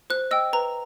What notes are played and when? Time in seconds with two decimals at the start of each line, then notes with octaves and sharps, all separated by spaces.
0.10 C5 F#6
0.31 D#5 G5 E6
0.53 B4 A#5